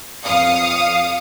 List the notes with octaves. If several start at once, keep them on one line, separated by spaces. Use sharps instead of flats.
F2 F5 D#6 C#7